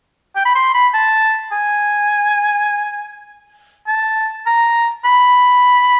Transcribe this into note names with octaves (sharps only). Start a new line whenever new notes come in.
G5
B5
C6
B5
A5
G#5
A5
A#5
B5